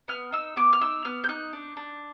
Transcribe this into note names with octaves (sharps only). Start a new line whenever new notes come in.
B3 F6
D#4 E6
B3 D6
F6
D#4 E6
B3 F6
G6
D#4 F#6
D4
D4